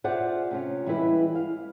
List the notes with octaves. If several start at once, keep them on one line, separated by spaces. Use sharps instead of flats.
F4 G#4 C5 D5 E5 F#5
C3 C#4 F4
E3 G3 G#3 E4 B4
F5